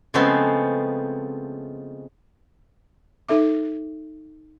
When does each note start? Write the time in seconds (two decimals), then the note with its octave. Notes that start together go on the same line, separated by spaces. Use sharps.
0.14 C#3 F3 G#3 A3 B3 C4
3.29 D#4 A4 E5 D6